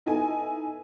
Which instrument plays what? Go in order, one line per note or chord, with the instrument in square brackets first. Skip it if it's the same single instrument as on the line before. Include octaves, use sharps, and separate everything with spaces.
[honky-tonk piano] B3 D#4 E4 A4 G#5